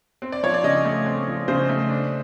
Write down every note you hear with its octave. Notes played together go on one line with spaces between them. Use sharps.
C4
D5
F3 C#5
D5
C#3 D#5
A3
C4
F3
C#3 C5
A3
D4